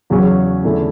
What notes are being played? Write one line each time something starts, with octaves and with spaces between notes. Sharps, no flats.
E2 C#3 F#3 C#4
E2 D3 A3 C#4 E4